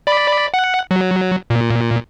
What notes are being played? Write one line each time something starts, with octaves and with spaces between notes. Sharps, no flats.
D5 B5
F#5
F#3
A#2